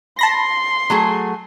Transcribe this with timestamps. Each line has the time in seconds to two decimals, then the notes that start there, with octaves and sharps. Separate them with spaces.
0.19 A5 B5 C6 A#6
0.90 F#3 A3 G#4